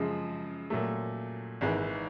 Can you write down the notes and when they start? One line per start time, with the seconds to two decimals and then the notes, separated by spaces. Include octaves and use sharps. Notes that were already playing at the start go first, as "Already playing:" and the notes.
Already playing: F#2 C#3 F3 G#3
0.70 A#2 F#3 A3
1.61 G#1 G#2 E3